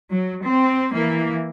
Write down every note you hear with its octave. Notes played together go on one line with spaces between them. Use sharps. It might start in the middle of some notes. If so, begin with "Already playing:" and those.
F#3
C4
E3 A#3